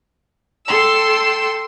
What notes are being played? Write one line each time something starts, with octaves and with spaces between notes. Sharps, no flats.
A4 G5 C6 E6